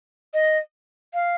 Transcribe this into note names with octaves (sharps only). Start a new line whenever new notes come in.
D#5
F5